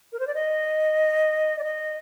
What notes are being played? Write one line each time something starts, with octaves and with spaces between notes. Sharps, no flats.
A#4
C5
D5
D#5
D5
D#5